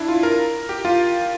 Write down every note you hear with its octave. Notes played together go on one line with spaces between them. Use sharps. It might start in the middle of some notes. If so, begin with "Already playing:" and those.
Already playing: D4 E4
F4
A#4
G4
F4